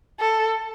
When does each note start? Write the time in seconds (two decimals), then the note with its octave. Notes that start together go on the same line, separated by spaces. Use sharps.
0.19 A4